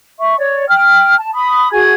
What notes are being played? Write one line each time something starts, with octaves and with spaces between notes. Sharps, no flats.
E5 C#6
C#5 D5
G5 F6
A5
B5 D#6
F#4 G#4 G#5 G#6